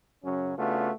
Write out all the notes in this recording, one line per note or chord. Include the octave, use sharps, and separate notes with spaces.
F#2 C#3 F#3 C#4
C#3 A3 B3 D4 F4 F#4